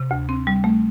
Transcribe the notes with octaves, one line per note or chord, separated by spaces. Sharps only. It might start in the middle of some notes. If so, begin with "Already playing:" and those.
Already playing: C3
D2
C4
G3
A3